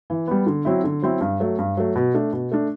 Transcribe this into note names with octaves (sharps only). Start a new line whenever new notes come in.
E3
G3 B3
D3
F#3 C4 E4
D3
F#3 C4 E4
G2
F#3 A3
G2
F#3 A3
B2
A3 D4
B2
A3 D4